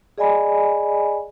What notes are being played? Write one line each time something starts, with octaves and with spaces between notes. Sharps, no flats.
G#4 D5 D#5 G#5 B5